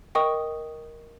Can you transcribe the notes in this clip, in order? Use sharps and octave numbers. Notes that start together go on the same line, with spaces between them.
A#4 D#5 G5 C#6 D#6